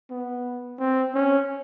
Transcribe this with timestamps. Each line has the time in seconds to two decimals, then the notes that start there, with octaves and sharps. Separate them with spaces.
0.10 B3
0.79 C4
1.15 C#4